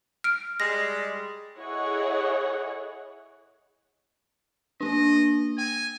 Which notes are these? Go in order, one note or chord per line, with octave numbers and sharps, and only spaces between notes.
F6 D7
G3 G#3 A#6
E4 G#4 A4 C#5 D#5 F#5
A#3 D4 D#5
G5 G#5